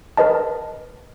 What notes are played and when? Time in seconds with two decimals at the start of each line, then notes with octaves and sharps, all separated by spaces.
0.17 A#4 B4 D#5 A5